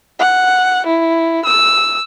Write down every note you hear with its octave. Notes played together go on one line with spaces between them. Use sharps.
F#5
E4
E6